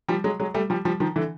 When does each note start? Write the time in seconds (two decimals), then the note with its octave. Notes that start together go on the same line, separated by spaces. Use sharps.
0.08 F3 G3
0.24 F#3 G#3
0.40 F#3 G#3
0.54 G3 A3
0.70 F3 G3
0.85 F3 G3
1.00 D#3 F3
1.16 D3 E3